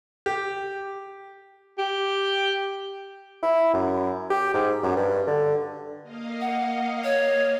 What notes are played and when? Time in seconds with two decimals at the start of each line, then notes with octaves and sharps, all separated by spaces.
0.26 G4
1.78 G4
3.43 E4
3.74 F#2
4.30 G4
4.54 G#2
4.83 F#2
4.96 G2
5.27 D3
6.03 A#3 D#5 F5
6.41 F#5
7.04 C#5